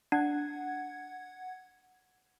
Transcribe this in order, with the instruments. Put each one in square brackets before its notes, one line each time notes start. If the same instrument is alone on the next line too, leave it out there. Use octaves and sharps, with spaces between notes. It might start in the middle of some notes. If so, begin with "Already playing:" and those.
[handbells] D4 [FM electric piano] F#5 G#6